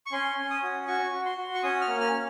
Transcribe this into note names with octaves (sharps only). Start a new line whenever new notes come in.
C#6
C#4 C6
C#4
D#6
F#4
F#4 C#6
F#4
C6
F#4
C#6
C#4 D#6
F6
A#3
F6
C#4